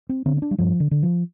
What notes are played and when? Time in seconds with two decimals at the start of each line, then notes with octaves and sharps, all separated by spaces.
0.09 C4
0.26 D3 C4
0.37 C4
0.42 D4
0.51 G3
0.58 G2 F3
0.80 D3
0.91 D3
1.03 F3